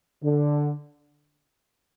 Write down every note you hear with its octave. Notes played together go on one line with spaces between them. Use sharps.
D3